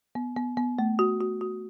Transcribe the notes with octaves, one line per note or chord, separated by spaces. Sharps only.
B3
B3
B3
A3
F#4
F#4
F#4